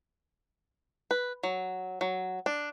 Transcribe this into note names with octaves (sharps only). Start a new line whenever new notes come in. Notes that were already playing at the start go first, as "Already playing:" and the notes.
B4
F#3
F#3
D4